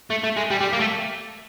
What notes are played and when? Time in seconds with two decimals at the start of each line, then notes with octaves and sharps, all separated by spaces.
0.10 A3
0.24 A3
0.37 G#3
0.51 G3
0.61 G3
0.73 A#3
0.80 A3